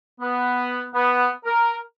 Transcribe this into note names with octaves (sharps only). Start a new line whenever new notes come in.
B3
B3
A#4